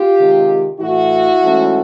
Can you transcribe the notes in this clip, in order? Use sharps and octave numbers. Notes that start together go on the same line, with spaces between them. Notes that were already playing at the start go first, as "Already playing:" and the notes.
Already playing: F4 G4
C3 D#3 G#3
A2 E3 A3 E4 F#4
G#2 E3 A3 C#4